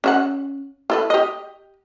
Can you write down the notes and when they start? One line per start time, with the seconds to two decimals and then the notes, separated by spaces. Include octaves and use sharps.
0.04 C#4 E5 F#5
0.90 E4 A4 B4
1.10 G4 D#5